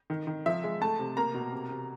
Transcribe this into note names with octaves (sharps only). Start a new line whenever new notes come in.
D#3
D#3
F3 E5
G#3
A3 A5
C3
A#3 A#5
B2
C3
C3